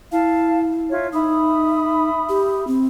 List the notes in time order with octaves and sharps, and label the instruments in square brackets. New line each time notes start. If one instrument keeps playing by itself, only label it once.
[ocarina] E4 [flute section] F5 A5
[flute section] F4 C#5 E5
[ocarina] D#4 [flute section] E5 B5 D#6
[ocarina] G4
C4